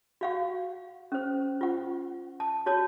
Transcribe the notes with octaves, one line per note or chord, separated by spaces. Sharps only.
F#4 F5 F#5
C#4 C5
F4 F#5
A5
F#4 C#5 A5